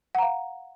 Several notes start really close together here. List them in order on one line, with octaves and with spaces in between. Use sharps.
F#5 A#5 F5